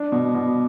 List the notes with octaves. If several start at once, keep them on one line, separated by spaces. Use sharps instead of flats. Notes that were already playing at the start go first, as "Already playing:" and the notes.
Already playing: D4
B2
B2